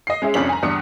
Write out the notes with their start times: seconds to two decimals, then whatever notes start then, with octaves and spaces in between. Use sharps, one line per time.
0.07 D#5 C7
0.22 G#3 C#4 G#4 E5
0.34 F1 F2 C#4 D4 B6 F#7
0.49 G#5 A#5
0.63 E2 G2 D4 D#6 C#7